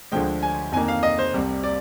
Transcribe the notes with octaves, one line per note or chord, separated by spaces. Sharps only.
D2 D3 F3 G#3 G5
G#5
F2 D#3 A#3 G#5
F5
D#5
C5
C2 C3 G3
D5